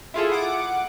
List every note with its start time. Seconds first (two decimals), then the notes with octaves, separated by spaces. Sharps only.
0.14 E4 F4 G#4 A4
0.32 F#5 D6